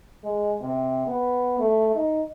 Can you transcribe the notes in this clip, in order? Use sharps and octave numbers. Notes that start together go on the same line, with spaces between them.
G#3
C3
B3
A3
D#4